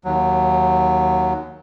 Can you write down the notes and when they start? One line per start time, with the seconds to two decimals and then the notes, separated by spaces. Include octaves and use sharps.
0.05 D#2 F#3